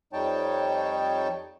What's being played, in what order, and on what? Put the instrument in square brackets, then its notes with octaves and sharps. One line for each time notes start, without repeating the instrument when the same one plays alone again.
[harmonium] F2 G3 D#4 C#5 G5 A5